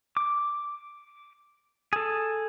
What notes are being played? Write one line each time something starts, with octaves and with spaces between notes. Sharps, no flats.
D6
G#4 A4